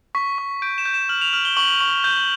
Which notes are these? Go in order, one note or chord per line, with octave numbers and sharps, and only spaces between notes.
C#6 B6
C#6
G6 D7
E7
G6
E7
F6 F#7
F7
F6 F#7
G7
C#6 F#7
C#6
G6